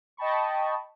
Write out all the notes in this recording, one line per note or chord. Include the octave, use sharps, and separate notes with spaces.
D#5 G5 A5 B5 C#6